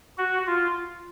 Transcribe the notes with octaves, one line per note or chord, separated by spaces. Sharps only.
F#4
F4